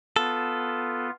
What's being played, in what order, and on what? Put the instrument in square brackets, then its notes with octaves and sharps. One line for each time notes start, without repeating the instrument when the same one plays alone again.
[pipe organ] B3 F4 [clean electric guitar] A4